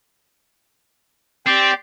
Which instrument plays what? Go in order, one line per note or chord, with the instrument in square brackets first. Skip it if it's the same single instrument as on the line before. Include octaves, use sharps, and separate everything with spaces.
[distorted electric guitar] C4 [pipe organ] G4 D5